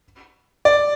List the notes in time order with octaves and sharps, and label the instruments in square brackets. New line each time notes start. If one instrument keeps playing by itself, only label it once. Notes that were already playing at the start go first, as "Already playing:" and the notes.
[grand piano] D5